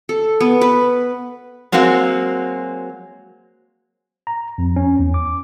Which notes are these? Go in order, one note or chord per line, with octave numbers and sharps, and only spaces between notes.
A4
B3
B4
F#3 G#3 A#3 C4 F#4
A#5
F2
C#4
E2
D6